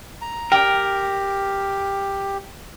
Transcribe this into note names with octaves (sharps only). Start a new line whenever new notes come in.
A#5
G4 A#4 G5